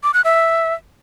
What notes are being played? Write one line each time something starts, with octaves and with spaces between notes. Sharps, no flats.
D6
F#6
E5